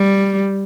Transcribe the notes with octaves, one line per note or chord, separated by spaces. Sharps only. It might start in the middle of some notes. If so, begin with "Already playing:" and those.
Already playing: G3